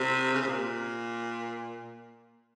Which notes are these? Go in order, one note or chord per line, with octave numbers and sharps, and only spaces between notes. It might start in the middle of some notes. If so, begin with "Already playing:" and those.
Already playing: C3
C#3
C3
A#2